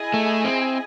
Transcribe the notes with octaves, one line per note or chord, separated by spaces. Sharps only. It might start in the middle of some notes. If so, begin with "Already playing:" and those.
Already playing: E4 G#4 D#5 G#5
A3
C4